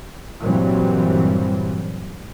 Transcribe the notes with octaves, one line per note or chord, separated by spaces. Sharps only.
G2 A#2 E3 F#3 G3 C4